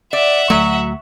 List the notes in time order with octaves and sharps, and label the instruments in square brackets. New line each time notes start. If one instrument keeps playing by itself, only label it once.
[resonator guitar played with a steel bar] D5 [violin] E5 F#5
[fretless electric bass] D2 A3 [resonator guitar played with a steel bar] F#3